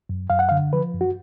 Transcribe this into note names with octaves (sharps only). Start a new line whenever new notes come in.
F#2
F#2 F5
F#5
D3 F5
F3 B4
F#2
F#4